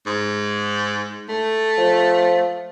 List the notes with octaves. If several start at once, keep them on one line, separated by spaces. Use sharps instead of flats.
G#2
A3
F3